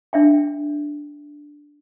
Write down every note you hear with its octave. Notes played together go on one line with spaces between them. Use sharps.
D4 E5 G5